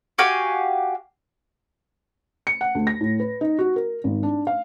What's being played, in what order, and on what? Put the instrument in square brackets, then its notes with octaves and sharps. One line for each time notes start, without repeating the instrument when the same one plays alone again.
[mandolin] F#4 G4 F5 G#5
[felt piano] C#7
F#5
D2
A#6
A2
B4
D#4
F#4
A#4
G#1
D4
F5